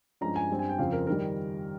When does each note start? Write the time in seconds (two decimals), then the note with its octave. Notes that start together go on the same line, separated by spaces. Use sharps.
0.21 G2 F3 G#3 C#4 A#5
0.36 G#5
0.50 G2 G3 C4
0.59 G#5
0.69 G5
0.78 F2 C#3 F3 C4 F5
0.92 A#4
1.07 D#3 G3 A#4